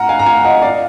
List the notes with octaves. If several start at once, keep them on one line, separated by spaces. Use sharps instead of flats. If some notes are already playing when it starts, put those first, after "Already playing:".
Already playing: F#5 A#5 F6
F5 G#5
A#5
F5 G#5
D#5 F#5
D5 F5